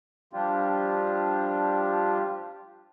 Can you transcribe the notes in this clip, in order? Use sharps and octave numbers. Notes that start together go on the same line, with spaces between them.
F3 G3 D4 F4 G4